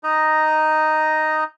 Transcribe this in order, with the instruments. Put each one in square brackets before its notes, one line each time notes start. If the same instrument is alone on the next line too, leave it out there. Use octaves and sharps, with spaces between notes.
[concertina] D#4 D#5 A#5